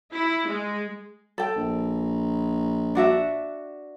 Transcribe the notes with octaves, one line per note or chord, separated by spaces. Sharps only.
E4
G#3
A4 G5
A#1
D4 F#4 E5